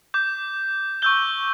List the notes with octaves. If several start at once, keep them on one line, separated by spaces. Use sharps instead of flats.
D6 G6
C#6 E6 G6 G7